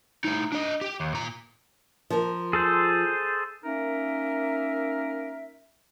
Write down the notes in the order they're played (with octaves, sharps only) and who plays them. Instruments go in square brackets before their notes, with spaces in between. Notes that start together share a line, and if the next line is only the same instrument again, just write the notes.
[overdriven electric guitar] A2 D#4
D4 D#5
G4
D#2
A#2 A#5
[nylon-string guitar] F3 A#4
[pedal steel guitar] G#4 A4 C5
[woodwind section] A#3 C#4 D#4 A#4 E5